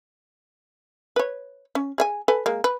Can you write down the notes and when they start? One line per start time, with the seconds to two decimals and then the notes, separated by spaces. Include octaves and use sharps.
1.16 B4 C#5
1.75 C#4
1.98 G#4 E5 G#5
2.28 A4 B4 G#5
2.46 G#3 A#3
2.64 B4